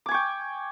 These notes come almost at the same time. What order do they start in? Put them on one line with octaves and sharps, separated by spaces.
D6 G#5 C#6 G5